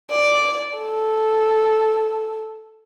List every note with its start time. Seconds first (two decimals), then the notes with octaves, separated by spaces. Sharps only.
0.11 D5
0.77 A4